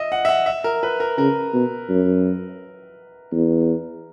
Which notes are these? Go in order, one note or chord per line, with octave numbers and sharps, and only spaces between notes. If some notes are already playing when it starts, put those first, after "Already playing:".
Already playing: D#5 E5
F#5
E5
F#5
E5
A#4
B4
A#4
C#3 A#4
B2
F#2
E2